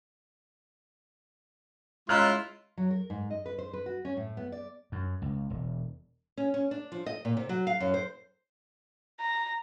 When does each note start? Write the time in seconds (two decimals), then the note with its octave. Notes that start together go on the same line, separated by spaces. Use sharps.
2.09 C#3 G#3 E4 F4 A#5 C6 F6 F#6
2.77 F#3
2.91 A#4
3.10 G#2
3.30 D#5
3.46 B4
3.59 C5
3.73 B4
3.86 F#4
4.05 C#4
4.17 A2
4.37 B3
4.52 D5
4.92 F#2
5.22 C#2
5.50 E1
6.37 C#4
6.54 C#4
6.71 D4
6.92 F3
7.06 D#5
7.25 A#2
7.37 C3
7.49 F#3
7.67 F5
7.80 F#2
7.94 C5
9.20 A#5